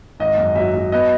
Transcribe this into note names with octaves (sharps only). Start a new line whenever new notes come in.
G#1 D#5
F#2
F#3 E5
F#3
B3 D#5